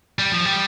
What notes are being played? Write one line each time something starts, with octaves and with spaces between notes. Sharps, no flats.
G3
F3
G3